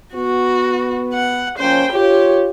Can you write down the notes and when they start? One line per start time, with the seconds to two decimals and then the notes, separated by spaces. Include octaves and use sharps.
0.15 B3 F#4
1.14 F#5
1.58 F3 A#3 C#4 C5 G5
1.92 F4 G4 C#5